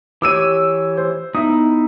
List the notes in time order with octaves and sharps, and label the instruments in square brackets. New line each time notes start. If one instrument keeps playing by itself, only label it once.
[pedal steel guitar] E3 G4 C#5 [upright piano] D6 E6 D#7
[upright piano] C5
[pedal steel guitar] B3 D#4 E4 [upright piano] E5 D#6